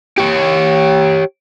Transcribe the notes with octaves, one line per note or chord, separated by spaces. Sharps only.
G4 C#5